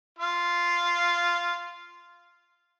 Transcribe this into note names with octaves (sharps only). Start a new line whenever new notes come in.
F4 F5